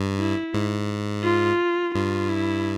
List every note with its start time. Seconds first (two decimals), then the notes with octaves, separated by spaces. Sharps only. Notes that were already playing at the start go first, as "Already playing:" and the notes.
Already playing: G2
0.19 E4
0.54 G#2
1.24 F4
1.94 G2 F4
2.29 E4